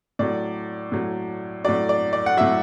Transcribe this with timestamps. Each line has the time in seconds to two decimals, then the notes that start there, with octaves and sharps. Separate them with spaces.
0.19 A2 F#3 D5
0.92 A2 F#3
1.65 A2 F#3 D5
1.89 D5
2.13 D5
2.26 F#5
2.37 A2 F#3 E5